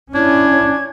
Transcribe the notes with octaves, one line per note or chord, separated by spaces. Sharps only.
C#4 D4 E4 G#6